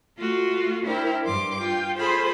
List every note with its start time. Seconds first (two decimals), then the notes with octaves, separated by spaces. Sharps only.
0.17 A3 F4 F#4
0.85 D4 E4 A#4 C5 G5
1.25 G2 C6 D6
1.59 F4 G5
1.96 F4 G#4 A4 C5 B5